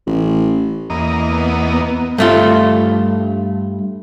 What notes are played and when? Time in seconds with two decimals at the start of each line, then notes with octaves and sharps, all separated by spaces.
0.07 A1
0.90 E2 A#3 D#5
1.25 B3
2.18 G2 A3 F4